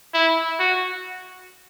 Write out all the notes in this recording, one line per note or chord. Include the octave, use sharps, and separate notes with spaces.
E4
F#4